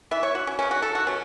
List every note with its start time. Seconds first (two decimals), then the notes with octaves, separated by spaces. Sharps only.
0.11 E3 B3 E5
0.23 C#5
0.35 F#4
0.47 C#4
0.59 C#3 F#3 B3 C#4
0.71 F#4
0.82 A4
0.95 F#4
1.07 B2 F#3 C#4